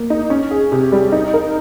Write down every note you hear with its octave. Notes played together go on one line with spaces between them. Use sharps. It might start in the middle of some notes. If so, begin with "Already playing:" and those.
Already playing: A#3
D#4
C#4
G#4
C3
G3
D#4
A#4